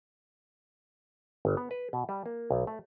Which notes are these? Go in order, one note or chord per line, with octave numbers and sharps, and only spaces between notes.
G1
B3
B4
B2
G3
A#3
B1
A3